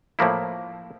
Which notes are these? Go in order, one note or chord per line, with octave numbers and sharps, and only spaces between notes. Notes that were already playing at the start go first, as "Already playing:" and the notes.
A2 F3 A#3 E4